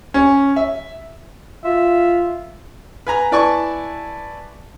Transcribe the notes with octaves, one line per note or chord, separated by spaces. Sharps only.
C#4
E5
F4 E5
B4 G#5 A#5
E4 B4 D5 G#5 A5 C#6